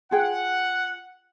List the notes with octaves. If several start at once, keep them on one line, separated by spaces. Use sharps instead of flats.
F4 G#4 F#5 G5